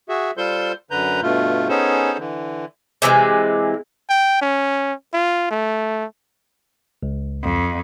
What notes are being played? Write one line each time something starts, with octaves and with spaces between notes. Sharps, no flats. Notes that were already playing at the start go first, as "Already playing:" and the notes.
F#4 G#4 E5
G3 F4 A4 C5 C6 G6
F#2 D3 B4 A#5 G6
G2 B2 A3 F4
B3 C#4 D#4 G#4 A4 C5
D3 E3
C3 E3 G3 G#3
G5
C#4
F4
A3
C#2
F2